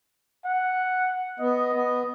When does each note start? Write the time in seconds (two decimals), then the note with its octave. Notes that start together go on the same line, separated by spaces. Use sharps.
0.45 F#5
1.39 B3 D#5
1.73 B3